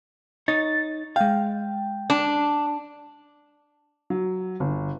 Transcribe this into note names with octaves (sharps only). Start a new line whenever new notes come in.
D#4 C#5 A6
G#3 F5 G5
D4
F#3
G1